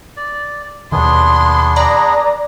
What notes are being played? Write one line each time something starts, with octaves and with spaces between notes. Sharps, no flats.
D5
D#2 B2 D#3 B3 D4 G#4 C6
D5 A#5